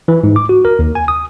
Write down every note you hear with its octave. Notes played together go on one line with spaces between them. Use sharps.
E3
G#2
D6
F#4
A#4
D#2
G#5
D#6